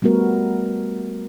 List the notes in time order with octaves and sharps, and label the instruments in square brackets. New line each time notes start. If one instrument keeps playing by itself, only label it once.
[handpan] G3 A3 B3 F#4 A#4